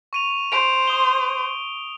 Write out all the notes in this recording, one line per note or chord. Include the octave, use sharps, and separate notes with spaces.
C#6 D#7 F7
C5 D7 F7
D#6 G7